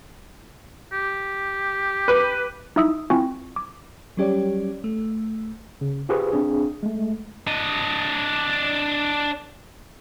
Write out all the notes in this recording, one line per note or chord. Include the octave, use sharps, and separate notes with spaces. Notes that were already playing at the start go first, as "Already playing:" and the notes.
G4
B4 D6
D#4 E4 E5 D#6 E6
C4 E4 F4 G5 G#5 C#6
D6
F#3 G3 C#4 G4 C#5 D5
A3
C#3
F4 G4 G#4 B4 C5 C#6
C4 D4 G#4
G#3 A3
D4 D#5